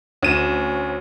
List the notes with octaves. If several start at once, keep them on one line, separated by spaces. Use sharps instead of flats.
D2 C#4 D#7 E7